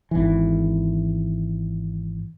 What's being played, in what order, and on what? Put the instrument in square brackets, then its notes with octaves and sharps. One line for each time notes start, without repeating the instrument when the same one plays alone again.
[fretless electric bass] G#1 E3